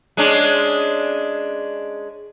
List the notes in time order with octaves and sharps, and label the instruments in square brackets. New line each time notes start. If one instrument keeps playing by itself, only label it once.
[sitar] G#3 C#4 D4